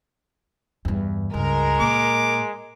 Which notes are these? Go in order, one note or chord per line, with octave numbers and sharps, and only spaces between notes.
E2 G2
C#2 G2 G#3 A#4
A#2 D6